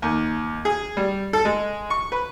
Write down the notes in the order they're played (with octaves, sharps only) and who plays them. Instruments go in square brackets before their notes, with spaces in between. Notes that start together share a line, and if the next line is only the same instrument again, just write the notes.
[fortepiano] D#2
G#4
G3
A4
G#3
C#6
B4